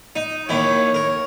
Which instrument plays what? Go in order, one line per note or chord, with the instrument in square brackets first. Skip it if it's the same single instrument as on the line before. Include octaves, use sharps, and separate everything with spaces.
[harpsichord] D#4
[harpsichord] D#2 D#3 E4 [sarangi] C#5
[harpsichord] A#4